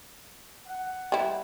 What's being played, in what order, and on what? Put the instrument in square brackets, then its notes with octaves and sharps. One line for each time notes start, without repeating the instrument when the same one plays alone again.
[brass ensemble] F#5
[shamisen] G3 E4